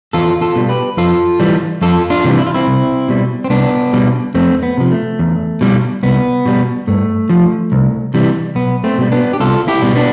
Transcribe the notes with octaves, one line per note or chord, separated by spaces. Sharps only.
E2 F4 A4
F4 A4
B2 G3
G4 B4
F2 F4 A4
E3 G3
F2 F4 A4
D4 F4
C3 E3 G3
E4
F4
C4 E4
C2
B2 G3
C4
C2 B3 D4
B2 G3
F2 A3 C4
B3
C3 F3
A3
E2
B2 G3
C2 B3
B2 G3
G2 A3
F3
C2
C3 E3 G3
B1 B3
A3 C4
B2 G3
B3 D4
G4
C2 F4 A4
E4 G4
B2 G3
B3 D4